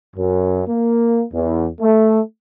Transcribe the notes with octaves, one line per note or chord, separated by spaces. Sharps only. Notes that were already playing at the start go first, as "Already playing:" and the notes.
F#2
A#3
E2
A3